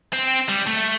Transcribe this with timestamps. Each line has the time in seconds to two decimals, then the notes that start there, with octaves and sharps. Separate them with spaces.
0.13 C4
0.49 G3
0.67 A3